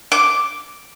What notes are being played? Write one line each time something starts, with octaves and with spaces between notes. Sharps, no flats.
D6